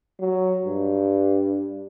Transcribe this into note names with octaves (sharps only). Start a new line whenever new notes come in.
F#3
G2